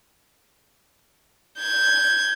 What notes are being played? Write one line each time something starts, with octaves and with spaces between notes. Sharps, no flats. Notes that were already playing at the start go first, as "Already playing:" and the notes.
G6 G#6